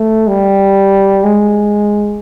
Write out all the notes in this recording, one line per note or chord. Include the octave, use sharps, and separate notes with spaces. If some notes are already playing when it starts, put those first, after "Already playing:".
Already playing: A3
G3
G#3